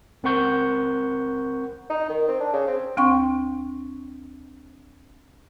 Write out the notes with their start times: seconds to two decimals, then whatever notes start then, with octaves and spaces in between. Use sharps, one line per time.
0.23 C#2 C4 A#4 F#5 C#6 G6
1.90 D#4
2.09 D#3
2.28 C4
2.40 D4
2.53 C#3
2.68 C4
2.97 D2 C4 G5 C6 C#6